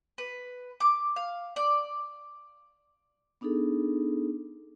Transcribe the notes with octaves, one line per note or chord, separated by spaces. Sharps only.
B4
D6
F5
D5
B3 D4 D#4 G#4 A4